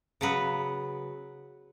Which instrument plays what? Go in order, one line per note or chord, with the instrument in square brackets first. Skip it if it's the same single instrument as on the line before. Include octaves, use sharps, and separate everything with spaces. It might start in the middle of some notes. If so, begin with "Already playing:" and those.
[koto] C#3 F#3 B3 B4